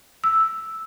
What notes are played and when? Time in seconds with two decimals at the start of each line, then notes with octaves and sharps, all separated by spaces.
0.24 E6